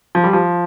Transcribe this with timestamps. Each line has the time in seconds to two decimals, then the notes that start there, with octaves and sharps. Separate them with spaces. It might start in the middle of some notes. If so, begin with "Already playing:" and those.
0.15 F3
0.24 G3
0.33 F3